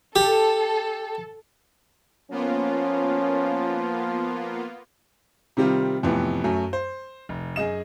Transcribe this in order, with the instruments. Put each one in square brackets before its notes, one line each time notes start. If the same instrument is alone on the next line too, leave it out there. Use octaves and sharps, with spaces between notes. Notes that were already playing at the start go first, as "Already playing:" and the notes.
[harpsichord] G4 [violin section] A4
[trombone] F3 [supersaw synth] A#3 B3 F4 [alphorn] C#4
[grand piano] C3 D#3 G3 C4 F4
F2 A2 C3 E3 B3
F#2 F#3 A3
C5
F1
F#2 G#4 D#5 E7